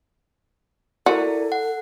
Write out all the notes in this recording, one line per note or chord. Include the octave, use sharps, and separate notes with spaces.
E4 F#4 A4 A#4 D5
F#5